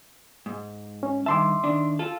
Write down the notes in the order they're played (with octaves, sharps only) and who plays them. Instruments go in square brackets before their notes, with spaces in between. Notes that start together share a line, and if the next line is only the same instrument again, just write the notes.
[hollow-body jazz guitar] G#2
[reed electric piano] C#4
[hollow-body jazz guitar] G2 D#3 A5 [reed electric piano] E5 C6 D6
[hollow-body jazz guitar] D#3 D4
F4 A4